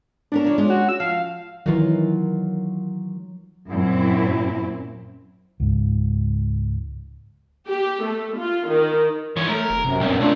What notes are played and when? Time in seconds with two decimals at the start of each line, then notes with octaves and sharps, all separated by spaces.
0.32 B3 C#4 D4 A#4
0.44 C#3 F3 C#5
0.58 G#3 C#4 F4
0.70 F#4
0.89 E6
1.00 F3 F5
1.66 D#3 E3 F#3 F4
3.71 F#2 A#2 C4 E4
5.60 C#2 G#2
7.68 G4
8.04 A3
8.37 F4
8.68 D#3
9.36 E3 F3 C#5
9.49 A3 A#4
9.70 F1
9.84 F#2 C3
10.00 B1 G2
10.20 A#2 A3 D4 F4